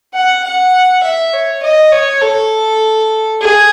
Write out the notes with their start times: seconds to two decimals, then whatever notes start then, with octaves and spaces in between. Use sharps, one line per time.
0.14 F#5
0.44 F#5
1.03 E5
1.33 C#5
1.63 D#5
1.92 C#5
2.22 A4
3.41 G#4